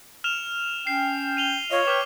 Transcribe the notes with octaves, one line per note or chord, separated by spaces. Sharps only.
F6 E7 F7
C#4 G5 C7
D#7 F7 G7
F4 C#5 D#5 F5
B4 G5 D6 F6